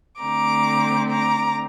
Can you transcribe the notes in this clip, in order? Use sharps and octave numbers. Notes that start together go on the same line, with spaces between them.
D3 A3 C4 A#5 D6
A#5 D6